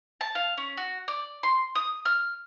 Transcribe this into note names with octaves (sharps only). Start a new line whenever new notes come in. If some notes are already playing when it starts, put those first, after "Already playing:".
A5
F5
C#4
F#4
D5
C6
D#6
F6